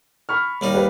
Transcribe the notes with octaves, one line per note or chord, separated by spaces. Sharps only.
B5 C#6 F6
D#2 G3 D#4
B4